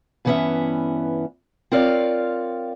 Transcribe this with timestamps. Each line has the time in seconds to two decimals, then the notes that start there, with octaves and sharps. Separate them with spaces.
0.25 G2 D3 E3 B3 C#4 E5
1.72 C4 F4 A#4 C#5 D5 F5